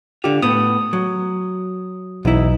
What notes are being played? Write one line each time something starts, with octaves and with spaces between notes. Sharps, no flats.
D3 F4 G4
A2 B3 D#6
F#3
B1 E2 D#4 E4